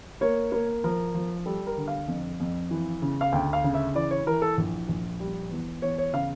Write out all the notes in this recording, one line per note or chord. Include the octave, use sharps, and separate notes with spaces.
A#3 C#5
A#3
F3 A#4
F3
G3 A4
A#4
D3
F5
F2
F2
E3
C#3
F5
D2 G5
F5
C#3
E5
E3 D5
C#5
E3 A#4
A4
A#1
A#1
G3
E2
E2 C#5
C#5
C#3 F5